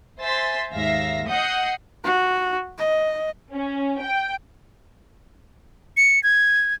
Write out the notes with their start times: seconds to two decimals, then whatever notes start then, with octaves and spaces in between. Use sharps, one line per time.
0.21 C5 E5 G#5 C6 A6 B6
0.73 D#2 G#2 E5 F5 A#6
1.27 D#5 F#5 D#6 G6 C7 C#7
2.04 F#4
2.78 D#5
3.52 C#4
4.01 G5
5.97 C#7
6.23 G#6